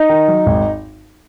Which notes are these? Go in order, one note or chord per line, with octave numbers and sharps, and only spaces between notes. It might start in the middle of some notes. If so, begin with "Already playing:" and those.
Already playing: D#4
D#3
F#3
G#1